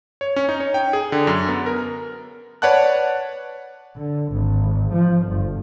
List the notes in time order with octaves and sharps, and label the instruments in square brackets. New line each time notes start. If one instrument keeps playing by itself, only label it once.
[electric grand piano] C#5
C#4
D#4
C#5
G5
G#4
D3
F#2
B3
A#4
B4 C#5 D5 F#5 A5 F#6
[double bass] D3
G#1
F3
G1